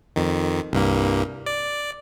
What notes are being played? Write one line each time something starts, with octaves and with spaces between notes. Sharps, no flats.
F2 D#3
C2 G2 A#3
D5